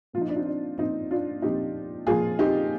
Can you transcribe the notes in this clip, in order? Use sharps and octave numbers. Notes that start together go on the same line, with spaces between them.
A#2 F3 D#4 F4
D4
C4 D#4
D4
A#2 F3 C4 D#4
D4 F4
A#2 F3 D#4 G4
A#2 F3 F4 G#4
D#4 G4